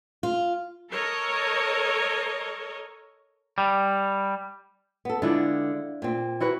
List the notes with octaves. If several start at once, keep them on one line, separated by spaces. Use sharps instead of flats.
F4
A4 A#4 C#5 D#5
G3
B3 A4
D3 G#3 D4 E4 F4
A#2 C4
E4 F#4 B4